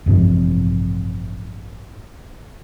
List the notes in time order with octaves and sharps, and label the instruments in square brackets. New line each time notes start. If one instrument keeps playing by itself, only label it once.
[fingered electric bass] A1 G2 C3 F3